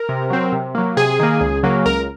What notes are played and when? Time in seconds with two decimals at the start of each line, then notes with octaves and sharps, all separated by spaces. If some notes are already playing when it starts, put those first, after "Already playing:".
Already playing: A#4
0.09 C3
0.30 F#3 C4
0.52 C3
0.75 F#3 A#3
0.97 C3 G#4
1.20 D#3 A#3
1.41 C#2
1.63 C#3 F#3 A#3
1.86 C#2 A#4